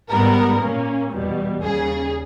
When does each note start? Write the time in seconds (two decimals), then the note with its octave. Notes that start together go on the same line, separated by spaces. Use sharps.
0.09 G#2 G3 B3 A#4
0.61 A#2 A#3 C#4
1.13 E2 B2 G3
1.64 D#2 C#3 G3 C#4 G#4